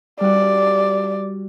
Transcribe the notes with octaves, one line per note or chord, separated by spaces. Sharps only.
G3 F#4 D5